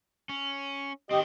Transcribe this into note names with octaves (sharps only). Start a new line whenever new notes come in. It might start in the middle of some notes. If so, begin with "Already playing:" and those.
C#4
D#3 C4 G4 D#5